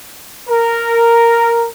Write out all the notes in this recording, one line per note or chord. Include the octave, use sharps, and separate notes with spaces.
A#4